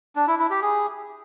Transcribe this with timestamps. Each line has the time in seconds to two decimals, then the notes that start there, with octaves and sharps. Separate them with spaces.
0.16 D4
0.27 E4
0.39 E4
0.50 G4
0.62 G#4